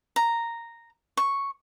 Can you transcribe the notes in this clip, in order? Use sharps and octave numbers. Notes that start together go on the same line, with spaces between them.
A#5
C#6